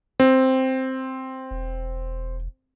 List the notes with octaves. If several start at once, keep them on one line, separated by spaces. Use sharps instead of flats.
C4
E1